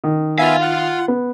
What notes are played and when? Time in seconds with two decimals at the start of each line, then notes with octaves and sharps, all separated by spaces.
0.04 D#3
0.38 B3 F4 E5 F5 G#5
0.62 F#5
1.08 B3